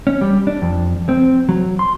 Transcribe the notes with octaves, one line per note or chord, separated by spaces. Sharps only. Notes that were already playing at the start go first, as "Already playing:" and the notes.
C#4
G3
D4
F2
C4
F#3
C6